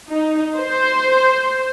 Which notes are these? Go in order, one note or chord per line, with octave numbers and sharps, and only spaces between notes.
D#4
C5